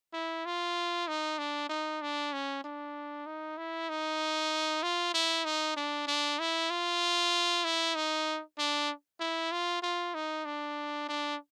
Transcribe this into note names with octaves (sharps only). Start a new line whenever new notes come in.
E4
F4
D#4
D4
D#4
D4
C#4
D4
D#4
E4
D#4
F4
E4
D#4
D4
D4
E4
F4
E4
D#4
D4
E4
F4
F4
D#4
D4
D4